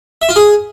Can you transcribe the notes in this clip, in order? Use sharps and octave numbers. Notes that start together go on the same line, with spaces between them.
E5
F4
G#4